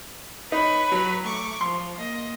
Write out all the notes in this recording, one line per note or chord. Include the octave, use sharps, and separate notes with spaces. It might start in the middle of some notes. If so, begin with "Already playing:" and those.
D#4 B4 C#5 B5
F#3
A3 C#6 D6
F3 C6
A#3 D#5